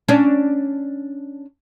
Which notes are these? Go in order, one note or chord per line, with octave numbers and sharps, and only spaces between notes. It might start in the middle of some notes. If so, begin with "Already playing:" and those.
C#4 D4